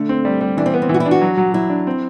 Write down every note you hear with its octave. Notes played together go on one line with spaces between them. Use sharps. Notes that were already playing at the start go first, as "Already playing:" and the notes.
Already playing: D3 A3
C4
G3
G3
E3 D4
C4
B3
C4
E3
F#4
E4
D4
F#4
F#3
F#3
F#3 E4
D4
C4